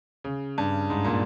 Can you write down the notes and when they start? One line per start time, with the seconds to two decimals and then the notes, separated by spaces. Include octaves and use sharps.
0.24 C#3
0.58 G2
0.90 G#2
1.05 A#2